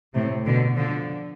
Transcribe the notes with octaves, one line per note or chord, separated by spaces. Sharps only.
A2 C3
B2 D3
D3 F3